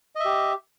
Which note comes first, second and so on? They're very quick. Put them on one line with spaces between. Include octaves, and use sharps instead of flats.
D#5 E5 G4